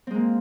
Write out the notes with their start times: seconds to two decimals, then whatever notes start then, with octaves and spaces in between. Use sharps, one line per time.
0.07 C4
0.11 G#3
0.14 A#3